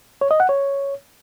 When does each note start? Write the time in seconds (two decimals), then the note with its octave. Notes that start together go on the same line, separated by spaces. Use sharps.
0.21 C#5
0.31 D#5
0.40 F#5
0.49 C#5